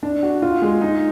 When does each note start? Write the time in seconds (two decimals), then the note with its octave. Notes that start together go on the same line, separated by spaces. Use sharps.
0.03 D4
0.23 F#4
0.42 F4
0.62 G#3
0.81 D#4